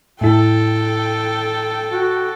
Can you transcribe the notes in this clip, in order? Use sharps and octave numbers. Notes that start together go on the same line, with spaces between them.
A2 E4 A4 G5
F#4